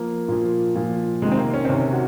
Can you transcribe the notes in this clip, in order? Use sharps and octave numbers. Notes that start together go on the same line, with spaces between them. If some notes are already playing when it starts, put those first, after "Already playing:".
Already playing: F3 A#3
A#2 F3
A#2 F3
C3 D#3 G#3
C4
A#3
C#4
C4
C3 D#3 C#4
F#4